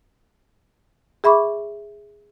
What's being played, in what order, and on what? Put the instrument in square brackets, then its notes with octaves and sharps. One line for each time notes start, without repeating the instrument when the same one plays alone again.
[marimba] G#4 E5 B5 C#6 D6